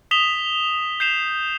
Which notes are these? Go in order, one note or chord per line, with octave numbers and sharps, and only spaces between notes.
D#6 B6 E7 F7 G7
G6 C7 E7 F7